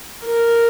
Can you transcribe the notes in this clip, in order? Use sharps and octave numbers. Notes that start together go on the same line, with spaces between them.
A#4